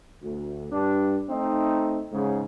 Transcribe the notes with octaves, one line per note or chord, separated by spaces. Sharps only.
D2
G2 D4
A3 C4 D#4
G#2 C#3